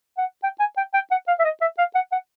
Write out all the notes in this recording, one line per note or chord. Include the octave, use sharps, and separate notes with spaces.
F#5
G5
G#5
G5
G5
F#5
F5
E5
D#5
E5
F5
F#5
F#5